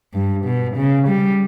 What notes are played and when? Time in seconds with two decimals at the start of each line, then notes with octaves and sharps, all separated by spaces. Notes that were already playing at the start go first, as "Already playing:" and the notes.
0.14 G2
0.45 B2
0.77 C#3
1.08 G3